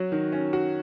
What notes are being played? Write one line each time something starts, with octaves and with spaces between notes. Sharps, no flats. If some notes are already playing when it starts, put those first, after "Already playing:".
Already playing: F#3 F#4
D#3
C#4
F#4